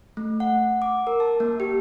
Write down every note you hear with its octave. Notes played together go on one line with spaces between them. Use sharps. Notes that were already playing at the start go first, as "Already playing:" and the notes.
A3
F#5
D6
A#4
A5
A#3
G4